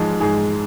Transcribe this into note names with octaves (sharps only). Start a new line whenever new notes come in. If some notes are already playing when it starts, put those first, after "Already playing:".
Already playing: G#2 F3 G#3
G#2 G#4